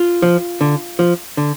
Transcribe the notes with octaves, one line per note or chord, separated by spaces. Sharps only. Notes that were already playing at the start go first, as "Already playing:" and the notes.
Already playing: F4
F3
D3
F3
D3